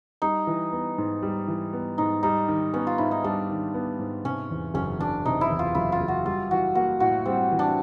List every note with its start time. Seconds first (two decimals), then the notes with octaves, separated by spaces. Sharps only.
0.22 G3 D#4
0.47 E3
0.73 B3
0.98 G#2
1.23 G3
1.48 E3
1.73 B3
1.98 G#2 D#4
2.23 G3 D#4
2.48 D#3
2.74 B3 C#4
2.87 F4
2.98 G#2 E4
3.11 D#4
3.24 G3 D4
3.50 D#3
3.74 B3
3.99 G#2
4.24 C3 C#4
4.50 E2
4.74 F#1 C#4
5.00 F#1 D4
5.25 C3 D#4
5.41 E4
5.50 E2
5.59 F4
5.75 F#1 E4
5.92 F4
6.01 F#1
6.08 F#4
6.26 G3 F4
6.51 E3 F#4
6.75 A#3 F#4
7.00 A2 F#4
7.26 G3 C4
7.51 E3
7.59 D4